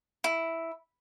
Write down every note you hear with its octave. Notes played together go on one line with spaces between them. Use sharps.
E4